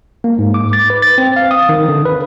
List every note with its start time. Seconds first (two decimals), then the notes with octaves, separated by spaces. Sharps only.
0.24 A#3
0.39 G#2
0.54 D6
0.73 A6
0.90 B4
1.02 A6
1.18 C4
1.36 F5
1.51 D#6
1.69 D#3
1.89 D3
2.05 B4